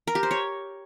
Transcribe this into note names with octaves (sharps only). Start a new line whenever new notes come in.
A#4
G4
C5
C#5